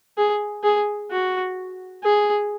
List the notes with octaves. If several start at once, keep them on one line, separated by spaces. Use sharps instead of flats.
G#4
G#4
F#4
G#4